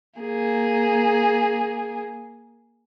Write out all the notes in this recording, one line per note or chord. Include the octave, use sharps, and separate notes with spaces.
A#3 G#4